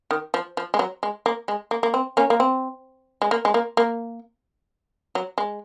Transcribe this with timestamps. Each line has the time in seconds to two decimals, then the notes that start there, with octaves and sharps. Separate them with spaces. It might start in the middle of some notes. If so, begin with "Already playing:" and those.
0.11 D#3
0.34 F3
0.57 F3
0.74 G#3
0.79 F#3
1.03 G#3
1.26 A#3
1.48 G#3
1.71 A#3
1.83 A#3
1.94 C4
2.17 A#3 C#4
2.30 A#3
2.40 C4
3.22 G#3
3.31 A#3
3.45 G#3
3.54 A#3
3.77 A#3
5.15 F#3
5.38 G#3